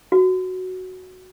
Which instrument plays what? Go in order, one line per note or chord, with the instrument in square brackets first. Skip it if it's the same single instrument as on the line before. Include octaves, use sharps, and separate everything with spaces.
[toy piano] F#4